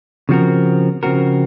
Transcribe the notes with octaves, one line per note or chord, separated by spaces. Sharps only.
C#3 F3 C4 F#4 A#4
C#3 F3 C4 F#4 A#4